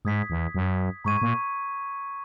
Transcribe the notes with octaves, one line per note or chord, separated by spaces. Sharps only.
G#2 D#6 G#6 B6
E2
F#2
G#2 A#5 C#6 G#6 D#7
A#2